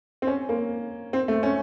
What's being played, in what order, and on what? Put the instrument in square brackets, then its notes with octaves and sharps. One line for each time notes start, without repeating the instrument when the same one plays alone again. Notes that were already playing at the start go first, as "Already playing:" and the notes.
[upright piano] C4
C#4
A#3
C4
A3
C#4